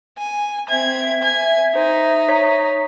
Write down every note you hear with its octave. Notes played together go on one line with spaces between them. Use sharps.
G#5
C4 E5 G#6
G#5 G#6
D#4 C5
C#5 B6